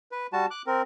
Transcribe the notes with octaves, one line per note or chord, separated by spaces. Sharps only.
B4
G3 F#4 A5
D6 F#6
C4 A#4